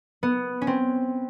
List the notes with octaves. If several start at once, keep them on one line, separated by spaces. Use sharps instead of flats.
B3
C#4
C4